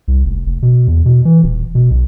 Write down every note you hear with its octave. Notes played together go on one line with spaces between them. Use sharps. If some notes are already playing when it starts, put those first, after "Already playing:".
C2
F1
F1
B2
E2
B2
E3
D#1
B2
B1